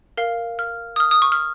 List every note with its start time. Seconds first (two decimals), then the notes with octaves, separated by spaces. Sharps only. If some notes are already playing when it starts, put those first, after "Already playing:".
0.17 A#4 F5
0.59 F6
0.96 D#6
1.00 F6
1.11 D#6
1.22 C#6
1.32 F6